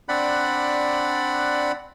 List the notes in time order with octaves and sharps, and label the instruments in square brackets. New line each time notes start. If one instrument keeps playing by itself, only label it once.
[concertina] C4 D4 D5 F#5 B5 F#6